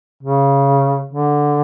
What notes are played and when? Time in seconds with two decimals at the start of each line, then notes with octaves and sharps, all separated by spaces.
0.23 C#3
1.13 D3